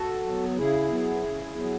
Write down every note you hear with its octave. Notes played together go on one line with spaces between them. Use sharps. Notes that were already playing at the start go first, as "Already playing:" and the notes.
Already playing: F#4 A4
F#3 B3
C#3 E4 G#4
F#3 B3
C#3
F#3 B3